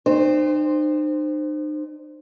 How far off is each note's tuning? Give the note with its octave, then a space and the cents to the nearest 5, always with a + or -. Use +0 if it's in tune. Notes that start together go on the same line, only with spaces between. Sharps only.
D#4 -45 C5 +0 G5 +40